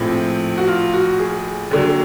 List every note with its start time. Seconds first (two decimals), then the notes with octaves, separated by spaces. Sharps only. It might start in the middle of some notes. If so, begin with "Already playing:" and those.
Already playing: A#1 A2 F3 C4
0.57 F#4
0.68 F4
0.93 F#4
1.19 G#4
1.71 D#2 D3 F#3